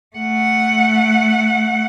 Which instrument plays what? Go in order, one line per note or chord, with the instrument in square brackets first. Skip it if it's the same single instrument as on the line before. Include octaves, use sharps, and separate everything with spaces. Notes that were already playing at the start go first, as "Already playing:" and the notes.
[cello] A3 F#5